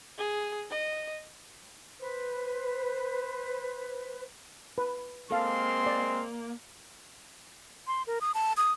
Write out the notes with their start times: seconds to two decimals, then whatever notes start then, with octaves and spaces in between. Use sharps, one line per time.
0.18 G#4
0.70 D#5
1.99 B4 C5
4.78 B4
5.31 G#3 A#3 C4 A4 F5 A5 C6
5.86 D5
7.87 C6
8.07 A#4
8.21 D#6
8.34 A5
8.57 D#6